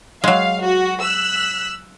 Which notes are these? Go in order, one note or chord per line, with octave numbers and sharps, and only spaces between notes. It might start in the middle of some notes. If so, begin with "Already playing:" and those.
F#3 G#3 F5
F#4
E6 F#6 B6